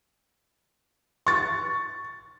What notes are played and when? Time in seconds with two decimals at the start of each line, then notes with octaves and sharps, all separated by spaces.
1.27 C#6 A6